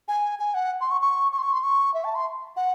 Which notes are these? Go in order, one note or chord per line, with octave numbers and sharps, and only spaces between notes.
G#5
G#5
F#5
C6
C#6
C#6
C#6
C6
C#6
C6
C#6
E5
A5
C6
F#5